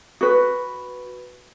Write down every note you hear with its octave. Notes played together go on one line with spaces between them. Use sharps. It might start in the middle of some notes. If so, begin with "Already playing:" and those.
F#4 B4